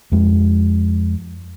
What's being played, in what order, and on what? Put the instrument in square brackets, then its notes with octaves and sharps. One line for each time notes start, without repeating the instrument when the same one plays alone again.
[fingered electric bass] F2 G#3